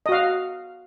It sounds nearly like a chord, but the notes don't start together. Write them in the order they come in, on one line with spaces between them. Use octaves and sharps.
D#5 F#4 F5